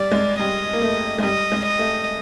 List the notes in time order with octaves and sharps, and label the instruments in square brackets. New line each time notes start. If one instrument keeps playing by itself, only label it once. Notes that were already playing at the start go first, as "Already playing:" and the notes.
Already playing: [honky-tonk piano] G3 [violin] D5
[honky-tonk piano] G#3
[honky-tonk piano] G3 [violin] D#5
[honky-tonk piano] A#3
A3
G#3
[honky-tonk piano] G3 [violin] D#5
[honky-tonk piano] G#3
[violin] D#5
[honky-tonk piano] A3